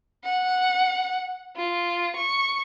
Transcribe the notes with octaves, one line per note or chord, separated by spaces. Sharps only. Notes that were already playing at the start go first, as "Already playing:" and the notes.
F#5
F4
C#6